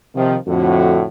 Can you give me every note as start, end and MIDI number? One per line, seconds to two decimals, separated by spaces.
0.16 0.37 48
0.16 0.37 51
0.16 0.37 53
0.47 1.04 41
0.47 1.04 45
0.47 1.04 50
0.47 1.04 66